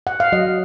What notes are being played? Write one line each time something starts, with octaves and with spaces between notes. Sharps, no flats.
F#5
F5
F#3 D#5